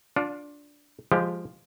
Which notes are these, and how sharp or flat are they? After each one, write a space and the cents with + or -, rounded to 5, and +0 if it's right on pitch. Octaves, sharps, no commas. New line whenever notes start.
D4 -10 F4 +25
F3 +0 G#3 -15 G4 +5